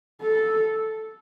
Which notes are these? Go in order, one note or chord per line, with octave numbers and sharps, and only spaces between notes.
A4